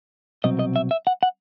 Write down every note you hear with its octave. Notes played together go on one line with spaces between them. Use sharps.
C2 B2 F#3 C4 D#5
D#5
E5
E5
F#5
F#5